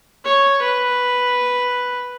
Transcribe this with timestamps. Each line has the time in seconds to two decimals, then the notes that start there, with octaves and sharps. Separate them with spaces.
0.25 C#5
0.62 B4